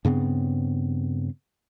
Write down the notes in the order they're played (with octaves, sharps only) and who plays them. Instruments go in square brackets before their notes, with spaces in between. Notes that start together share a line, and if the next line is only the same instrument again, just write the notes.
[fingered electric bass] G2 C#3 B3 C4